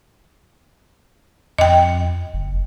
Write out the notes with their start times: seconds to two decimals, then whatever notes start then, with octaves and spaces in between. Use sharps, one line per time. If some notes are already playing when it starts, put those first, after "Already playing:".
1.58 F2 D#5 G5
2.34 F#1